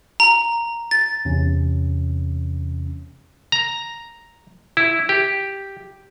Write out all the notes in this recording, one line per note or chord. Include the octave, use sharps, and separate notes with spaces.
A#5
A6
E2 C3 C#4
A#5
E4
G4